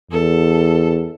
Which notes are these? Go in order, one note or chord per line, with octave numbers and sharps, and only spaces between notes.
E2 A4